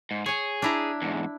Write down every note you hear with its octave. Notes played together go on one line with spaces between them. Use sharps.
G#2
G#4 C#5 G#5
D4 E4 A#5
E2 G#2